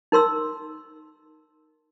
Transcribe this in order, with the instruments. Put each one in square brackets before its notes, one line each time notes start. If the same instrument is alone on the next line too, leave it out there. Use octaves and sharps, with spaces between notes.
[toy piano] D#4 A#4 C6 E6